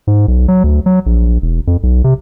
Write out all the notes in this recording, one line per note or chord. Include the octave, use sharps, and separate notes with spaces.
G#2
B1
F#3
D2
F#3
A#1
E1
F2
B1
C3